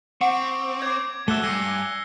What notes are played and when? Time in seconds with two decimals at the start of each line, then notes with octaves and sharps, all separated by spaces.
0.21 C4 F#5 C#6 D6 D7
0.82 C#5 D6 G#6
1.28 G#2 A3 F#4 E5 E6 F#6 G7
1.43 G2 G#5 A#6 C7 C#7